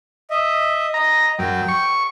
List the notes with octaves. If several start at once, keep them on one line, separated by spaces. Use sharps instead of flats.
D#5 E5
D#5 A#5
F#2 G5
C#6